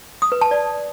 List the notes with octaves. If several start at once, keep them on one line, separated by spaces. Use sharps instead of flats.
D#6
B4
A5
D5